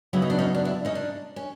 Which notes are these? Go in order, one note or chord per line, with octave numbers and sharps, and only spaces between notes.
C#3 F#3 B3 E4
D#4
D4
C#4 D#4
D4
D4 E4
C#4 D#4
D4
C#4